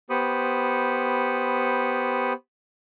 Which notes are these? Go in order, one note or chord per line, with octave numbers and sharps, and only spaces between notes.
B3 G4 C5 B5 C#6 D#6